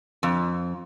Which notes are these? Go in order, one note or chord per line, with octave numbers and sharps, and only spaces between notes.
F2